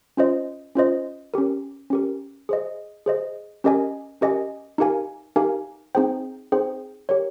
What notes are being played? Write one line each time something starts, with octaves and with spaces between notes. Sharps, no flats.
C#4 F4 C5 D#5
C#4 F4 C5 D#5
C#4 G4 A#4
C#4 G4 A#4
G#4 C5 D#5
G#4 C5 D#5
C#4 G4 A#4 D#5 G#5
C#4 G4 A#4 D#5 G#5
D#4 G4 A#4 F5 G#5
D#4 G4 A#4 F5 G#5
C4 D#4 G#4 C5 G5
C4 D#4 G#4 C5 G5
G4 A#4 C#5